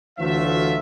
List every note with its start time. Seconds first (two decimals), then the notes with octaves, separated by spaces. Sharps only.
0.19 D2 E3 F#3 A3 F4 E5